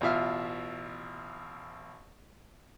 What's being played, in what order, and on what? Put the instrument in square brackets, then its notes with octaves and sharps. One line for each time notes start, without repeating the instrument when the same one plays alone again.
[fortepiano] A1 B2 F4 E5 F6